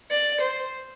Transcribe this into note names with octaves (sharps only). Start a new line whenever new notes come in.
D5
C5